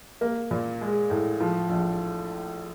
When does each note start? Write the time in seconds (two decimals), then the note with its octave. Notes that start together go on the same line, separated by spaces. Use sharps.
0.21 A#3
0.51 A#2
0.81 G#3
1.10 A2
1.40 F3
1.70 A#1